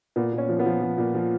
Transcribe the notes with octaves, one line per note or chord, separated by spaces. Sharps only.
A#2 B3
A#2
C#4
F3
B3
F3
F3
A#2
F3